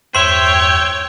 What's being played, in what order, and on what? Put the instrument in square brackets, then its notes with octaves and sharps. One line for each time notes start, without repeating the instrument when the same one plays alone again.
[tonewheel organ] E2 G2 [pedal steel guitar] C5 E5 [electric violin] C#5 G5 [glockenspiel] C6